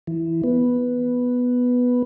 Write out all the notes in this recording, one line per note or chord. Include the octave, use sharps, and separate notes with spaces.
E3
B3